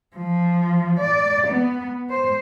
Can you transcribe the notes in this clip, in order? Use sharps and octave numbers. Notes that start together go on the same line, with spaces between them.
F3
D5
B3
C5